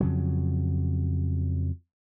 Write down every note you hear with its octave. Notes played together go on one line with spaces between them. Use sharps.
F2 C#3 F#3